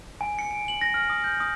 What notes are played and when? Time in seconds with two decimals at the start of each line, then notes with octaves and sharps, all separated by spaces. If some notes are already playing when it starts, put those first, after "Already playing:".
0.21 G#5
0.39 C#7
0.51 D7
0.68 F#7
0.81 A#6
0.94 F6
1.10 D#6
1.24 G6
1.40 D#6